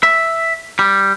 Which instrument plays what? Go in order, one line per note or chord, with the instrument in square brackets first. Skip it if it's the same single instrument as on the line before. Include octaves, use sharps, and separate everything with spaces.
[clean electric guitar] E5
G3